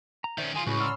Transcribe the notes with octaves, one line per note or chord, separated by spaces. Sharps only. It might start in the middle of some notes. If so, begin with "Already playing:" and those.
A#5
D#3 C#4 C5 D5 E5
D#3 F4 G#4 G#5 C6
C#2 A2 C#4 F#4 G#4 B5
F#4 D5 A#5 C6 E6 F6